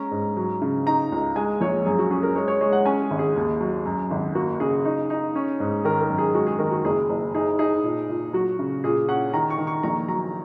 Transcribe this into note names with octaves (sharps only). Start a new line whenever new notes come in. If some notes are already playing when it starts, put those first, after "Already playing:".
Already playing: G#3 C#4 A#5
G#2
F#3
C#3
D#4 A#5
C#2
G#3 G#5
A#1 C#5
F#2 G#4
F#4
C#4 G#4
A#4
G#3 C#5
C#5
G#3 C#5
F#5
C#4 G#5
G#4
G#1
G#4
D#2
F#3
F#2
G#1
A#3 F#4
C#3 G#4
D#4
D#4
C#4
G#2
D#3 A#4
A#4
F#2
G#4
G#3 F#4
G#4
D#3 A#4
F#4
F#1 G#4
F#1
D#4 G#4
D#4 G#4
A#2
A#2
F#3 F#4
C#3
A#2 G#4
C#4 F#5
D#3 A#5
C#6
D#3
C#6
A#1 A#5
F#3 A#5